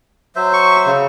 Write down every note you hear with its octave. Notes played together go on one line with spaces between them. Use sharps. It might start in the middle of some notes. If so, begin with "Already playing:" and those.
F#3 C5 E5
C#6
C#3